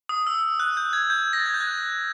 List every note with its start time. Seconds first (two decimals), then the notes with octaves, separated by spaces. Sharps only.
0.09 D#6
0.27 E6
0.60 F#6
0.77 G6
0.93 G#6
1.10 G6
1.33 A#6
1.39 A6
1.46 G#6
1.54 G6
1.60 F#6